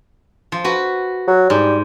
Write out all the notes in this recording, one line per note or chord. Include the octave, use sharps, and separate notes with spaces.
F3
F#4 B4
F#3
G#2 G3